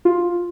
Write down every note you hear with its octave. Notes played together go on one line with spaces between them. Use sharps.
F4